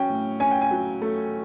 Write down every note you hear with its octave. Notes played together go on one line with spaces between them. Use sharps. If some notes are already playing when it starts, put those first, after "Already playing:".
Already playing: F#3 C#4 G5
A2
C#4 G#5
G5
G#5
F#3
A3